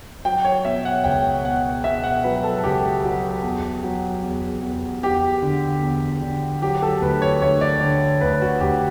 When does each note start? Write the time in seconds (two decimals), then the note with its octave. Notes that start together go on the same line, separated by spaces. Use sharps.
0.25 F#3 G5
0.45 C#5
0.65 B2 E5
0.85 F#5
1.04 C#2 G5
1.45 B2 F#5
1.84 B2 E5
2.04 F#5
2.24 F#3 B4
2.44 A4
2.64 C#2 G4
3.04 F#3
3.43 E2
3.83 F#3
4.23 E2
4.63 E2
5.02 E2 G4
5.42 D3
5.82 E2
6.22 D3
6.62 F#3 G4
6.82 A4
7.02 D2 B4
7.22 C#5
7.41 D2 C#5
7.61 D5
7.81 D3
8.21 D2 B4
8.42 F#4
8.60 D2 G4